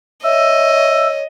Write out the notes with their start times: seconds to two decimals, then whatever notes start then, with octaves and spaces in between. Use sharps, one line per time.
0.24 C#5 D#5 E5 E6